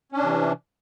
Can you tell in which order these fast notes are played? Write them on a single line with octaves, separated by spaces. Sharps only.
C#4 D4 C3 E3